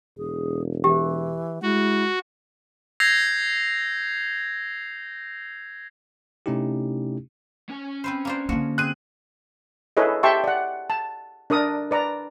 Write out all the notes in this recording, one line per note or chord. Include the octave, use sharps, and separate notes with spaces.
E1 G#4
E3 G4
G#3 E4 F#4
E6 G6 G#6 A#6 C7 F7
C3 A3 C#4 D#4 E4 G4
C#4 G#5
C4 B4 C5
A#3 D4 C5
D3 F3 A#3 F#4
C4 G#4 F#6 D#7
E4 G#4 A4 B4 C#5 D#5
G4 E5 G5 A5 C6 C#6
D5 F#5
A5
D4 A#4 D5 D#6
B4 D5 A#5